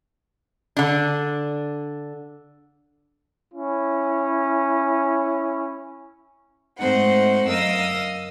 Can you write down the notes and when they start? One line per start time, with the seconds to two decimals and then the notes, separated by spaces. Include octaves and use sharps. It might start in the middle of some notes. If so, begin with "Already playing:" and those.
0.77 D3 D4
3.53 C#4 E4
6.78 G#2 A3 C4 D#4 C5 F#5
7.47 F#2 A#4 D#5 F5 D#6 E6